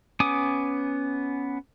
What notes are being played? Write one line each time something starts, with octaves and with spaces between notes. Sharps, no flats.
B3 C#4 G#5 D6 D#6